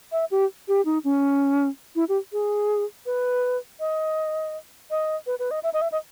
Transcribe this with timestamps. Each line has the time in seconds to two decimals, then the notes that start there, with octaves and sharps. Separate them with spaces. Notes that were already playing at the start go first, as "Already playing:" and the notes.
0.12 E5
0.31 G4
0.68 G4
0.85 D#4
1.04 C#4
1.96 E4
2.09 G4
2.32 G#4
3.06 B4
3.80 D#5
4.90 D#5
5.26 B4
5.39 B4
5.51 D#5
5.63 E5
5.73 D#5
5.81 E5
5.92 D#5